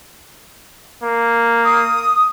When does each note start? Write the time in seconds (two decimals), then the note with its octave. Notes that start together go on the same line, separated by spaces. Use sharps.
1.02 A#3
1.65 D#6